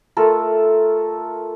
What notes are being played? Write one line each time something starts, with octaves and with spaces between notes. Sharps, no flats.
A3 F4 A4 A#4